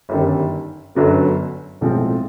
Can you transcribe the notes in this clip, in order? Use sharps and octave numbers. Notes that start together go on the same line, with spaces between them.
G1 F#2 D#3 G3
G1 F#2 D3 F#3 B3
B1 A2 F3 G#3 C4